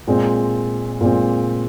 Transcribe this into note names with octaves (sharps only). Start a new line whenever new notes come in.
A#2 G#3 C4
A#2 G#3 C4